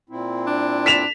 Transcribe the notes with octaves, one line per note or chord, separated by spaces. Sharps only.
A#2 C4 E4
D4
B6 E7 F7